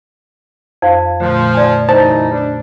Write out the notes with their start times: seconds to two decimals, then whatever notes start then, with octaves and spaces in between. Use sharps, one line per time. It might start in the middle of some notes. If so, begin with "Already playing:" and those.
0.82 F2 C5 F5
1.20 A#2 D3 F3 A3
1.55 D5 G#5
1.89 F#2 E3 D#4 C5 A5
2.30 G3 D4